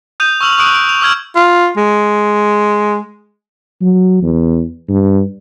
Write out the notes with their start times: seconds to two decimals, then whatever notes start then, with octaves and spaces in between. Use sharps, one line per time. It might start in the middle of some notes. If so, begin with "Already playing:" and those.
0.20 D#6 G6 D#7 F7
0.41 C#6 E6 F6 F7 F#7
0.58 C#6 D#6 F#6 D7 D#7
0.75 D7
0.89 F7
1.01 D6 E6 F6 G#6 F#7
1.36 F4
1.77 G#3
3.82 F#3
4.23 E2
4.89 G2